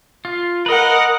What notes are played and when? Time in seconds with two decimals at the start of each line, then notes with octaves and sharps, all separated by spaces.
0.25 F4
0.66 A#4 B4 D#5 F#5